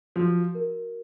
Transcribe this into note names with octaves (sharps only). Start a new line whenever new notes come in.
F3 F#4
A#4